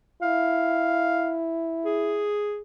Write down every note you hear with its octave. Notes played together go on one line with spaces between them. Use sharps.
E4 F5
G#4